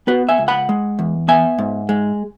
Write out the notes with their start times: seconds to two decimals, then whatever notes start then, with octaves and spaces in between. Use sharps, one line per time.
0.07 B3 F#4 B4
0.29 E5 G#5
0.38 C#2
0.48 F#5 B5
0.69 G#3
0.99 E2
1.28 B3 E5 G#5
1.58 G#2
1.89 G#3